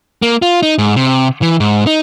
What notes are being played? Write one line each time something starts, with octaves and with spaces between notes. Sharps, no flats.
A#3
F4
D#4
G#2
C3
E3
G#2
D#4